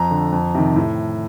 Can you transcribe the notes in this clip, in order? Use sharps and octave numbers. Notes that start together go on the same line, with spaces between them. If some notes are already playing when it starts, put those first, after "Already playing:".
Already playing: F2 A#5
D3
F2
C3 D#3
A2